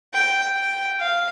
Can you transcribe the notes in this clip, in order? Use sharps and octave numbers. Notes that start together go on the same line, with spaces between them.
G5
G5
F5